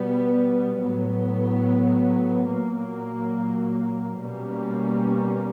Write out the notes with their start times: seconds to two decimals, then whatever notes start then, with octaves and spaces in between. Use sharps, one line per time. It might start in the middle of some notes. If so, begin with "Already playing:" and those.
Already playing: B2 G3 B3
0.83 A2 F#3 B3
2.52 A#2 F#3 A#3
4.20 B2 G3 A#3 C#4